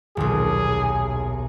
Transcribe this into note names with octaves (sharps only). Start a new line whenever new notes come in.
D#1 B1 G#4